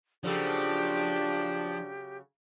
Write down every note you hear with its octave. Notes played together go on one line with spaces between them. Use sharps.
C#3 F3 F#3 D4 G4 A4